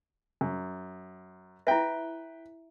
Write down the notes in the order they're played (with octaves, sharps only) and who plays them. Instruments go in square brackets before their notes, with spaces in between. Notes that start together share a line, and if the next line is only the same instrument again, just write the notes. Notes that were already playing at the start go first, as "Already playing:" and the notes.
[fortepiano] F#2
[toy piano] E4 E5 [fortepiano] B4 G5